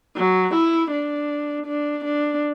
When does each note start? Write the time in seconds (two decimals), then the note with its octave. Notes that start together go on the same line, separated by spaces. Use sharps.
0.17 F#3
0.54 E4
0.91 D4
1.66 D4
2.05 D4